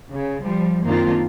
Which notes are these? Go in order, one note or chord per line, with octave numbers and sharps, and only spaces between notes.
C#3
F3 G3
F#2 D#3 A#3 C4 D4 F4